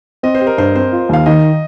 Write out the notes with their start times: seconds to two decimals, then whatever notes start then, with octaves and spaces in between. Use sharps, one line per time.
0.23 C4 D#5
0.35 C5
0.41 G4
0.47 A#4
0.58 G2 C5
0.75 C4 C5
0.92 F4
1.09 D#2 F5
1.26 D#3 D#5